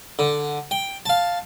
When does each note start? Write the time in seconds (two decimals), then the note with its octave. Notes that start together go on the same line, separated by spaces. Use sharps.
0.19 D3
0.71 G5
1.06 F5 A5